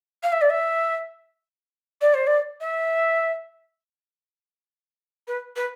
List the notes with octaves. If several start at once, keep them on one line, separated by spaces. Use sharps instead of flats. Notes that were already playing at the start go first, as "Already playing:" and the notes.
F5
E5
D5
E5
D5
C5
D5
E5
B4
B4